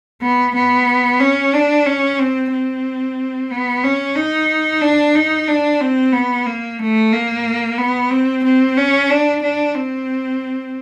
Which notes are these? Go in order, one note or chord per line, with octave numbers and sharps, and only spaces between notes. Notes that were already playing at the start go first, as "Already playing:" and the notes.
B3
B3
C#4
D4
C#4
C4
C4
B3
C#4
D#4
D4
D#4
D4
C4
B3
A#3
A3
A#3
B3
C4
C4
C#4
D4
D4
C4